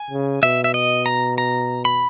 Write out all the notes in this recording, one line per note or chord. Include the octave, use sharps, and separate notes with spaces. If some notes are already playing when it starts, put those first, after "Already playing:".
Already playing: G#5
C#3
B2 E5
E5
D#5
A#5
A#5
B5